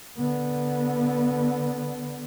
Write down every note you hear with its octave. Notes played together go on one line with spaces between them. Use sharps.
D3 B3